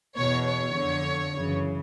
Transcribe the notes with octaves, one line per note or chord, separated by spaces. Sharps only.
E2 B2 C#5
C#5
F2 D3
F#2 C#3 E3